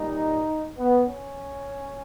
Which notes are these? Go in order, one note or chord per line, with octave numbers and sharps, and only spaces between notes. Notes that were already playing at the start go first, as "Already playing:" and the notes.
Already playing: A#2 G3 D#4
B3
C#4